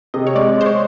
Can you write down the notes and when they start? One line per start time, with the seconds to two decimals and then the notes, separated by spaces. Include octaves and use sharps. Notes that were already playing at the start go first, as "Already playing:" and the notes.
0.14 C3 D#5
0.27 C#5
0.35 G#3 D5
0.58 G#3 C5
0.66 C#5